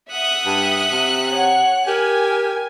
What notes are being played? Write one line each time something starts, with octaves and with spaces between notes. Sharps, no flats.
E5 F#5 D#6 F#6
G2
C3
C#5 F#5
G4 A#4 G#5